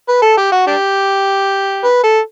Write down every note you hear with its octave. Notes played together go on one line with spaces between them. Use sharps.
B4
A4
G4
F#4
D4 G4
B4
A4